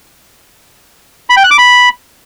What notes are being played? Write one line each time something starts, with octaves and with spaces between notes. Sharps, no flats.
B5
G5
F#6
D6
B5